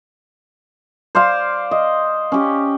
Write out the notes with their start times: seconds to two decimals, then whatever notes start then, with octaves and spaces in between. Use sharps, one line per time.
1.15 C5 D5 F5 C6
1.71 D#5
2.32 C#4 G4